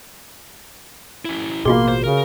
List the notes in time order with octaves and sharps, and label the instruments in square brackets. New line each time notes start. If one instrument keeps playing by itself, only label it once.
[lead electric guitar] C#4 E4
[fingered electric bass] A1 B2 B3 [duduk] A#3 [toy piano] F4 F#4 G#4 [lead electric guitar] C6
[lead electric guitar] C5
[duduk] C#3 [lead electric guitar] A#4